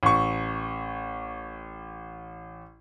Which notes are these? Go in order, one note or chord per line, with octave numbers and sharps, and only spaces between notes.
A1 C#6